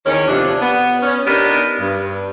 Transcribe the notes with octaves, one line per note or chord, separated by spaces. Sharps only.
E2 D#3 C#4
D2 C3 F3 D4
B3
C#4
B3 D4 D#4 G4 A#4
G2